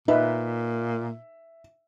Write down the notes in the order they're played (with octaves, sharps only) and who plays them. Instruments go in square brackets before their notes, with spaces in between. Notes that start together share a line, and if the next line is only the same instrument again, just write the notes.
[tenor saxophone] A#2 [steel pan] D#4 B4 [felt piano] E5